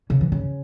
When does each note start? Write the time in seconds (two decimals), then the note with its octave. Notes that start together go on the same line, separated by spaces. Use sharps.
0.10 C#3
0.21 E3
0.32 C#3